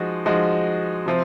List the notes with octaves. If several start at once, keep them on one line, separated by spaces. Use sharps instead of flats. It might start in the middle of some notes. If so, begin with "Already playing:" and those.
Already playing: F3 G#3 D#4 F#4
F3 G#3 D#4 F#4
C3 F3 C4